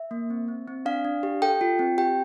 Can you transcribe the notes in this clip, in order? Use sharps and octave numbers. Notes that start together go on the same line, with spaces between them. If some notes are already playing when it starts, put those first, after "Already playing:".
Already playing: E5
A#3
C4
C4
C4
D4 F5
D4
G4
A4 G5
F4
C4
G4 G5